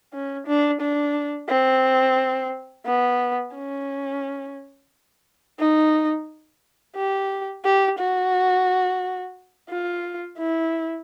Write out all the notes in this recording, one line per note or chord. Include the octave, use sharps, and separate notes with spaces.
C#4
D4
D4
C4
B3
C#4
D#4
G4
G4
F#4
F4
E4